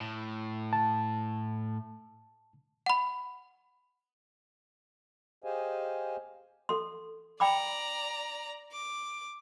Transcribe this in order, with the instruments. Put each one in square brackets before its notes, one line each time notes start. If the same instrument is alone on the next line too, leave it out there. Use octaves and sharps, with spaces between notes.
[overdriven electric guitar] A2
[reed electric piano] A5
[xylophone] F#5 B5
[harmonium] G4 G#4 C5 D#5 F5 G#5
[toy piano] A4 C6
[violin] D5 A#5 [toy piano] G5 B5 D6
[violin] D6